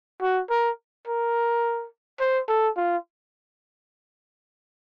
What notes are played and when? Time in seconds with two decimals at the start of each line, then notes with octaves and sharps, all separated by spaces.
0.22 F#4
0.50 A#4
1.08 A#4
2.20 C5
2.48 A4
2.77 F4